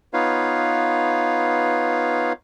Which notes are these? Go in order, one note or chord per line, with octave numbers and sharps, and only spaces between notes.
B3 D#4 F4 B4 C#5 F5